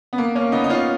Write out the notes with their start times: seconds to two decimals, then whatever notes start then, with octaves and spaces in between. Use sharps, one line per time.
0.13 B3
0.18 A#3
0.35 A#3 C#4
0.52 B3 D#4
0.64 D#4
0.70 C#4 F4